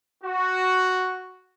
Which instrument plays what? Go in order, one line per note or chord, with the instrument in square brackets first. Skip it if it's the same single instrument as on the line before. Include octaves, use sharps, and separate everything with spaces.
[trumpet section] F#4